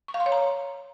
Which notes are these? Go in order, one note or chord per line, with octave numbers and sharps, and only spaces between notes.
C#6
F5
C6
C#5
A#5